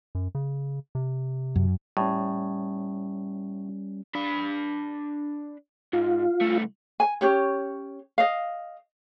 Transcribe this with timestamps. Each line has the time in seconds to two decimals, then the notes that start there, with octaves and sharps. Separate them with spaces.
0.15 F#2
0.35 C#3
0.95 C3
1.56 F#2
1.97 A2 G3 C#4
4.15 D4 B5
5.93 G#2 F4
6.41 C2 A3
7.00 G#5
7.21 C#4 G4 C#5
8.18 D#5 F5